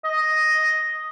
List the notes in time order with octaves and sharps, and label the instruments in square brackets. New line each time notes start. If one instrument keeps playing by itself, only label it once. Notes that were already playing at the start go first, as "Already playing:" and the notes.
[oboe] D#5